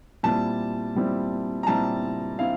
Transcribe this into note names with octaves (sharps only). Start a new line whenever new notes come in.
A#2 G3 C4 E4 A5
A#2 G3 C4 E4
A#5
A#2 G3 C4 E4 A5
C4 E4 F5